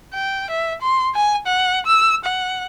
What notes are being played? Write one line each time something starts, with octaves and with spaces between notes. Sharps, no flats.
G5
E5
C6
G#5
F#5
E6
F#5